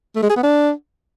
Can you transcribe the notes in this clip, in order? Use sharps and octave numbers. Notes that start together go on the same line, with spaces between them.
A3
G#3
G#4
B3
D4